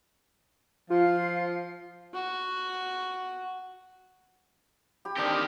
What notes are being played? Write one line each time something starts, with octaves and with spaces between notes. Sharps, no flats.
F3 F4 F5
F#4
G4 B5
D#3 C4 D4 G4 A4